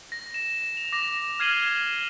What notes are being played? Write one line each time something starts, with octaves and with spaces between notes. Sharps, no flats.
A#6
E7
F7
D6 A#6 E7 F7
F6 G#6 C7 D#7 F#7 G7